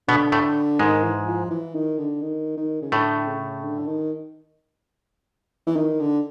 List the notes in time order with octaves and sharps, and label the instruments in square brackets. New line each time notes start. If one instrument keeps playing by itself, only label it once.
[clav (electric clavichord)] B2 B3 [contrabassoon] D3
[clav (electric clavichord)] A2 A3
[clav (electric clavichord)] G#2 G#3 [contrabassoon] D#3
[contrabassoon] E3
F3
E3
D#3
D3
D#3
D#3
C#3
[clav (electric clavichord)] A2 A3 [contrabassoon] D3
[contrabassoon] C#3
D3
D#3
E3
D#3
D3